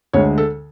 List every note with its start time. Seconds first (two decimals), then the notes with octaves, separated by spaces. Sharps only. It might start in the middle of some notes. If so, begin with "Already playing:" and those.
0.13 D2 D3 G#3 C#5
0.38 A4